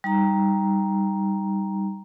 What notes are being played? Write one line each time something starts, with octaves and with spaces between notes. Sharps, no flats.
G3 D#4 A#5